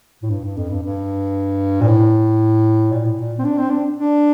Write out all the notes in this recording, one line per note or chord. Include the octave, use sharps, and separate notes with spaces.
A2
G2
G2
F2
G2
G2
A#2
A2
A#2
A2
A#2
C4
D4
C4
D4
D4